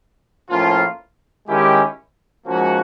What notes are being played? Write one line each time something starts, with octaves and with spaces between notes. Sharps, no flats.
A2 F3 A#3 C#4 F4
D#3 G#3 C#4 E4 G4
G#2 F3 A#3 C#4 F#4